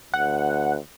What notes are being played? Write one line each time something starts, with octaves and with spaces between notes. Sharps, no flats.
D2 F#5